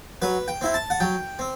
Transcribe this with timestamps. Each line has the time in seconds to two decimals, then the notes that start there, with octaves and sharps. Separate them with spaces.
0.22 F#3 B4
0.48 G5
0.61 C4 E4
0.74 A5
0.90 F#5
1.00 F#3 G5
1.39 C4